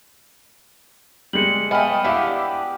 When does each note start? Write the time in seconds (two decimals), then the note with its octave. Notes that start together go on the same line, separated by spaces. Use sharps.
1.33 G3 G#3 C#7 F#7
1.71 A3 B3 D#5 F5 G5 G#5
2.04 D4 E4 G4 D5 E5 F5